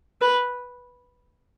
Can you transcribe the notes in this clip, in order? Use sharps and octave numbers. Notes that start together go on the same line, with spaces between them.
B4